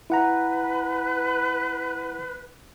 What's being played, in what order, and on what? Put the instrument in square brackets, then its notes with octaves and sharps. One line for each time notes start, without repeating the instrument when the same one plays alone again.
[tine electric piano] E4 F#5 A#5 [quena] B4